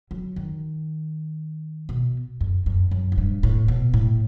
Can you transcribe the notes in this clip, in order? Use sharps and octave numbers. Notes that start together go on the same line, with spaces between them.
F#3
D#3
B2
F#2
F#2
F#2
A2
G2
A2
B2
A2